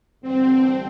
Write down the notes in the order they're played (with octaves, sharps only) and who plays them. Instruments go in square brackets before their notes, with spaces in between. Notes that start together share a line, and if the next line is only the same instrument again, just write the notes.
[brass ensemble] A1 G2 D3 G3 [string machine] C4